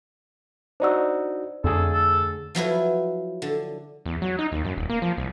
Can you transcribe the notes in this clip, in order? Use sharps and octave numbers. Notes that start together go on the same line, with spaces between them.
D4 D#4 F#4 C5 D5 E6
F2 D3 A3 G#4 A4
A4
F3 F#3 E4 B4
D3
E2
F#3
D#4
D#2
F#2
D#1
A#3
F3
C2